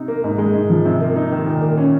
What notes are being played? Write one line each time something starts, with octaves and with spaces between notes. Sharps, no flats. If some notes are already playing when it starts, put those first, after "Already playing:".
Already playing: C3 D#4
A#3
G#2
G#3
G#2
F3
C3
A#3
D#4
D#3
A#2
A#3
C#4